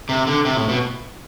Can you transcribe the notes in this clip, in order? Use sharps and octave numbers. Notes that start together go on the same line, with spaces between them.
C3
D3
C3
A2
B2